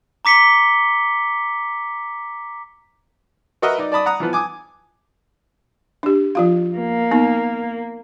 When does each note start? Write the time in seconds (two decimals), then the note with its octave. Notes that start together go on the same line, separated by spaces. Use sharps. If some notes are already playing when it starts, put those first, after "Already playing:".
0.25 A#5 D6 B6 C#7 G7
3.62 F#4 A#4 B4 D#5 E5 F#5
3.78 D#4 D5
3.92 D5 A5 B5 D#6
4.06 F#5 A#5 D#6
4.20 E3 F3 B3
4.33 G#5 D6 D#6
6.03 D4 G4
6.35 F3 F4 F5
6.77 A#3
7.11 B3 D#4